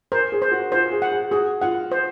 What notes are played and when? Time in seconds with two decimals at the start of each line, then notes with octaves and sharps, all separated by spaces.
0.12 A#4 C5
0.32 G#4
0.42 C5
0.51 F#4
0.72 F4 C5
0.91 G#4
1.02 F#5
1.12 G#4
1.31 F#4 G#4
1.62 F4 F#5
1.92 C5